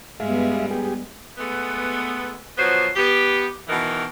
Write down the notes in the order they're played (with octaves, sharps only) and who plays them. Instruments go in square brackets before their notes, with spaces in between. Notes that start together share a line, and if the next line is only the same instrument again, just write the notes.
[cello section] G2 B3 [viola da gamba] G3 G#3 [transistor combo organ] G#4 E5 F5
[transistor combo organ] G4 G#4
[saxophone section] G#3 A3 B3
F3 F#3 B3 F#4 C5
B3 G4
B2 D#3 E3